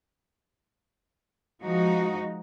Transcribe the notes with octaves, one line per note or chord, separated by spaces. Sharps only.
F3 G#3 D#4 F#4